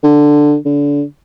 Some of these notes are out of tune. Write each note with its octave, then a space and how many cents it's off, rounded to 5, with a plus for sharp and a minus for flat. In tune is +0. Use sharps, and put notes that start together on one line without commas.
D3 +5
D3 -30